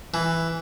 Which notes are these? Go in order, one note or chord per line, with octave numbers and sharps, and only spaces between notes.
E3